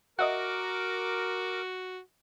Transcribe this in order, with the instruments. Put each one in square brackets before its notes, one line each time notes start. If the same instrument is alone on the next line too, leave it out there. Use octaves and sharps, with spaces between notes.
[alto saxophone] F#4 [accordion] A#4 D6 [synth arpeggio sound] D#5 E5 F#5